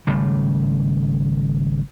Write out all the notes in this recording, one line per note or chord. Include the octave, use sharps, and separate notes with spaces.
G#1 C#3 G3 A3